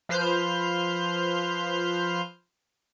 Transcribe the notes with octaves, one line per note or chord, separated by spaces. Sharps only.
F3 B4 C5 F6 G6